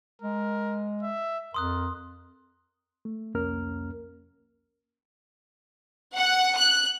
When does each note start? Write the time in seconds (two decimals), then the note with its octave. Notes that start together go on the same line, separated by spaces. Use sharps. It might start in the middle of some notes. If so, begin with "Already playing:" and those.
0.22 G#3 A#4
1.03 E5
1.54 F2 A#4 C6 D#6 F#6
3.05 A3
3.35 C2 F2 A#3 C#4 A#4 F6
6.16 F#5
6.57 F#6